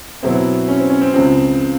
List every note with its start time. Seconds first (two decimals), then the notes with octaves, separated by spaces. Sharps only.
0.23 B2 F#3 B3 C4 E4
0.68 C#4
0.79 C4
0.90 C#4
1.01 C4
1.13 C#2 C#3 F3 C4